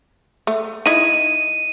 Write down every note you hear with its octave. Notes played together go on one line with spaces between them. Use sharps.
A3
D#4 E4 D#7